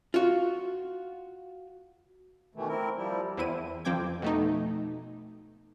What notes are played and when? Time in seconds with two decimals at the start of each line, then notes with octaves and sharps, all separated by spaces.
0.14 F4 F#4
2.55 B2 D#3 E3 A3
2.68 C4 E4 A#4
2.96 F3 G3 E4
3.37 E2 C4 E4 D#7
3.85 F2 F3 C4 G5 D6 G#6
4.22 B2 A3 D#4